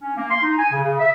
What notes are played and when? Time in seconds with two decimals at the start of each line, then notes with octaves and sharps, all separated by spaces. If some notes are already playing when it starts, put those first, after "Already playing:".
0.01 C#4
0.16 A#3
0.30 C6
0.42 D#4
0.58 G#5
0.72 C#3
0.84 C#3
0.99 E5